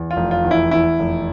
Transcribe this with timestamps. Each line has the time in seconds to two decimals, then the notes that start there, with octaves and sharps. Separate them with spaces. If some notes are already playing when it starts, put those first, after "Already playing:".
Already playing: E2
0.11 F4
0.17 F1
0.31 F4
0.44 E2
0.51 E4
0.71 E2 E4
0.99 F1